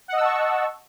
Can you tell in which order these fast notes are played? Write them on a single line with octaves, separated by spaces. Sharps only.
F#5 D#5 E6 A5 C#6